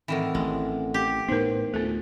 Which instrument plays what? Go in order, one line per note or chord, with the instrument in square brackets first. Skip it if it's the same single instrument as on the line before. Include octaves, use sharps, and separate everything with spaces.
[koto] A2 D#3 E3 [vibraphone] C4 A4 F#5
[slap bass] A1 [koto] G#3
[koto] G4
[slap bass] A2 B3 [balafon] D#4 A#4 [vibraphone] C5
[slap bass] D2 A3 [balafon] B3 A4 [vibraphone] F4